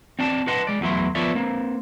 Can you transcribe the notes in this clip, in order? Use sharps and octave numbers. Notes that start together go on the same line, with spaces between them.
C4 D5 A5
B4 D#5 F#5 A5 C6
G#3 D5
E2 F#3 A3 E4 C6
F3 B3 A4 C#5 D5 E5
A#3 C4